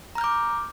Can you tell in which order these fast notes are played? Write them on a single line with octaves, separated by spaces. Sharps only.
A#5 F6 G6 D6